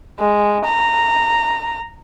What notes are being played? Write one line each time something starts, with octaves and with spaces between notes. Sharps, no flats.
G#3
A#5